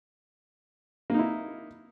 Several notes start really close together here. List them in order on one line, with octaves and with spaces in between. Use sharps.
A#3 D#4 E4